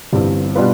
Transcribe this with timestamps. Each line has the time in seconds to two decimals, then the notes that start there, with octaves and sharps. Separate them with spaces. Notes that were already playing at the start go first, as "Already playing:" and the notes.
0.13 G1 G2 E3 G3 C4
0.55 B2 G3 D4 F4 B4